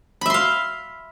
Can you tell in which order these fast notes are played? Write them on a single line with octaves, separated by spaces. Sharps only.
B5 E5 C6 F5